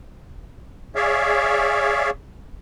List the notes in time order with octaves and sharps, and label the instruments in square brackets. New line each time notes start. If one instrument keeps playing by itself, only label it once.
[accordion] G#4 C#5 D5 E5 F5